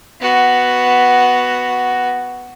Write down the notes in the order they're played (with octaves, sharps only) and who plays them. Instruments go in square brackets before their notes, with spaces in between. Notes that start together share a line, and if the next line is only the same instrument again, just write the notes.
[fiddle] B3 F#4